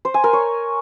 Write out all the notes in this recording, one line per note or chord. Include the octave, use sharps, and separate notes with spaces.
C5
G#5
A#4
C#5